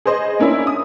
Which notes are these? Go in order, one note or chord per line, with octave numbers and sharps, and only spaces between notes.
G#4 B4 C5 D#5
A#3 C#4 D4 E4
D#6